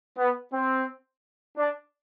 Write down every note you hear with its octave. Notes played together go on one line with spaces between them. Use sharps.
B3
C4
D4